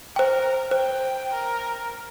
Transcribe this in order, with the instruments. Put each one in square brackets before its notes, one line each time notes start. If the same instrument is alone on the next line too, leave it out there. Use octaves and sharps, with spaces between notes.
[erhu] A#4 [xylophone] C5 G5
[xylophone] C5 [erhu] G5
[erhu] A#4